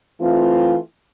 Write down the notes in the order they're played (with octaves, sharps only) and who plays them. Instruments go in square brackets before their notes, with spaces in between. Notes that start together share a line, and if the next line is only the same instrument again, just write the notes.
[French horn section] E3 A3 C4 F4